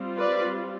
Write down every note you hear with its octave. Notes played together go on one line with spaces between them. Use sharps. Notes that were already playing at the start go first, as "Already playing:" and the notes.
Already playing: G3 C4 F4
B4 D5